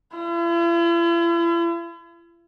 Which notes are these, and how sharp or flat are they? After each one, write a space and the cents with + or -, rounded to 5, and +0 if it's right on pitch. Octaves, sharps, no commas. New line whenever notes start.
E4 +45